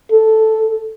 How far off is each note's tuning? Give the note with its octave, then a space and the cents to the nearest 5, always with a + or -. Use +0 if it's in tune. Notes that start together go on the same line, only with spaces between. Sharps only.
A4 +0